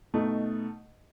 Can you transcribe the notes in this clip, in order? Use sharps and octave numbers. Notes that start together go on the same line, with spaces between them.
B2 A3 D#4